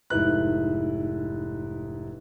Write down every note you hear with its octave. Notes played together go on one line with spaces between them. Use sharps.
F1 G#2 E4 B4 F#6